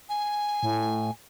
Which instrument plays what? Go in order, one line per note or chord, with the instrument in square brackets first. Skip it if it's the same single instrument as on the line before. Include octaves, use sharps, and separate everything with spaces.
[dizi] G#5
[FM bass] A2